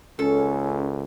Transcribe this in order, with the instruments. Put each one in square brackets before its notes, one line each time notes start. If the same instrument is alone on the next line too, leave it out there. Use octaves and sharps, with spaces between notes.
[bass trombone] C#2 [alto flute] C#4 [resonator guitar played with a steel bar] A4